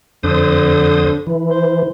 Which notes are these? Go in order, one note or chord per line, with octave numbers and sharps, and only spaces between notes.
F2 D3 C5 D#6
E3
C5